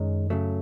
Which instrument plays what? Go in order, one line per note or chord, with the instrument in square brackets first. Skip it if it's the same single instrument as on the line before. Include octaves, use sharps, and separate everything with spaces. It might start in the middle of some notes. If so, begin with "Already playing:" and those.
Already playing: [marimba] F#2 [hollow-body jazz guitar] D#3 G#3 C#4
[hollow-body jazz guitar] C#3 F#3 A3